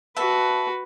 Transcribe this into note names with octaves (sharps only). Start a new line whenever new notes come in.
F#4 B4 E5 A5